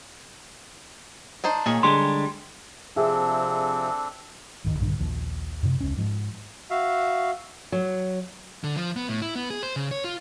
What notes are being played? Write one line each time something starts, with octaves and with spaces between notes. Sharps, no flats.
D4 D#4 C5
A#2 D#3 G#4 C#5
D3 G3 G#3 C6
C3 F3 C4 D4 G#4 A4 E5
D1 G1 F2 D#3
A#1 G2 D3 D#3
A#1 D#2 F3
F#2 C3
E1 C#2 C#4
G#2 F3
F#4 E5 F5
F#3
D3
F3
B3
A2
E4
B3
G#4
C5
C#3
C#5
F4